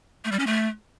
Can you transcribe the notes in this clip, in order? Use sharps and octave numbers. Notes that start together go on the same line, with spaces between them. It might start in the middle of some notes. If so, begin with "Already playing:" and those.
A3
G3
C#4
A3